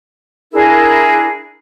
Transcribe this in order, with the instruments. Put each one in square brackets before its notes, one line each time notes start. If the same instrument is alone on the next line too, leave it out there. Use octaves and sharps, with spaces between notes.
[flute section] D4 E4 G#4 A#4